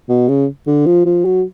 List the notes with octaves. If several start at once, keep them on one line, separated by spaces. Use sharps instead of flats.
B2
C#3
D3
F3
F3
F#3